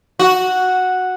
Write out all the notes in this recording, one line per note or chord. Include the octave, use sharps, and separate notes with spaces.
F#4